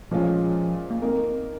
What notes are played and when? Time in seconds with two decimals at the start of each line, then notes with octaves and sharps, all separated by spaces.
0.11 A#2 F3 G#3 C#4 F4
0.91 A#3
1.02 A#3 C4 D#4 A#4